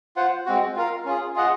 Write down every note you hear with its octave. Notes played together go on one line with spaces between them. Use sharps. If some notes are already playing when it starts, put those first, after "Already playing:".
F4 C5 F#5
G#3 C4 F#4
F4 A#4 F5
C#4 F4 G#4
F4 G#4 D#5 F#5